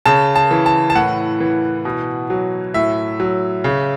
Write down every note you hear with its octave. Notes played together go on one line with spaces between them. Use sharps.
C#3 A5
A5
E3
A5
A5
A2 F#5
E3
B2
F#3
A2 E5
F#3
C#3